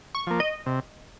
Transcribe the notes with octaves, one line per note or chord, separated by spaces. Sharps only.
C#6
F3 A#3
D#5
C3